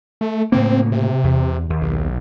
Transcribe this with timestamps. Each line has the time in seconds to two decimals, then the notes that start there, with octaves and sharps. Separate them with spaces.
0.21 A3
0.52 A2 C#3 A#3 C4
0.92 C3
1.24 E2
1.70 D#2
1.82 B1